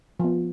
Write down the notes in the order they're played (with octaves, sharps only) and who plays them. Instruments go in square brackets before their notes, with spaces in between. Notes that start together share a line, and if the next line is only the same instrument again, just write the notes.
[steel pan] F3 B3